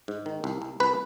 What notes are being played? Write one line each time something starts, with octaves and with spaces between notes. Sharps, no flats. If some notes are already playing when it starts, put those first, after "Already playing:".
G#2
D#3
C2
C2
C2 B4